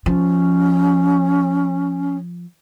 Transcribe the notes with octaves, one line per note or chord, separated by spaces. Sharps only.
F3 C#4